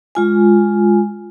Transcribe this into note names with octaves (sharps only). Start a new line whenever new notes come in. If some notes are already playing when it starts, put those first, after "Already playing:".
G#3 F4 G#5